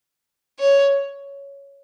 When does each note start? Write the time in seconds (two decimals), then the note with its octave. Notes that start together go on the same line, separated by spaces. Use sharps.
0.59 C#5